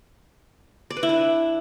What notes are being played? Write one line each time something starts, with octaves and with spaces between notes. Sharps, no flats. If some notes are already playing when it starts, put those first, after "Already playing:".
D5
B4
E4
D4